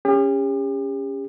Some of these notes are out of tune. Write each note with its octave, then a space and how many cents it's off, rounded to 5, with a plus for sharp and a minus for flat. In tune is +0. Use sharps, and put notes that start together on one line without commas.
C#4 +0 G4 +45